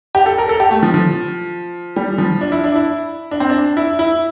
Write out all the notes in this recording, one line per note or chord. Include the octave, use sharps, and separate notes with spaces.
G4
A4
A#4
A4
G4
A3
F3
F3
G3
F3
D4
E4
D4
E4
D4
C4
D4
E4
E4